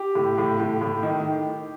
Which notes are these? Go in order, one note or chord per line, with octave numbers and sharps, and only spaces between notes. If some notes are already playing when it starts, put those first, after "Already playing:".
Already playing: G4
A2
A2
A2
A2
D#3